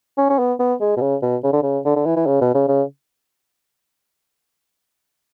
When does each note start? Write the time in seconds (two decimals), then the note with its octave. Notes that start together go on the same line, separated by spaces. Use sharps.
0.18 C#4
0.30 C#4
0.39 B3
0.60 B3
0.81 G#3
0.97 B2
1.01 C#3
1.22 B2
1.44 C#3
1.53 D3
1.63 C#3
1.85 D3
1.96 D3
2.06 E3
2.16 E3
2.27 C#3
2.41 B2
2.54 C#3
2.68 C#3